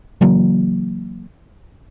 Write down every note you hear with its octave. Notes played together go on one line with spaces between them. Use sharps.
C#3 E3 F#3 A#3